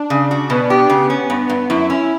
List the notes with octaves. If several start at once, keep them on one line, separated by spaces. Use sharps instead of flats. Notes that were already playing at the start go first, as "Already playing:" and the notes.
Already playing: D4
C#3
F#4
B2 B3
G4
C#3
C#4
G2
G2
F#2 E4
C#4